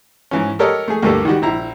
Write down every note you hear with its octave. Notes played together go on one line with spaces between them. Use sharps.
G#2 E3 C#4
G4 A4 A#4 C#5 D#5
A3 G#4
D2 G2 A#3 G4 A4
D#3 G3 F#4 G4
A#1 E4 A#5